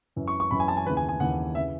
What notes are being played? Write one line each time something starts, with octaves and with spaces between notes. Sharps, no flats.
F#2 E3
C#6
C#6
F#2 E3 B5
G#5
A5
G#5
D#2 C#3 E3 B4
G#5
G#5
D#2 C#3 E3 F#5
C#3 E3 E5